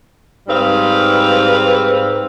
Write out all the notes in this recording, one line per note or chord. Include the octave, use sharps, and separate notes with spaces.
G#2 G3 C4 B4 F5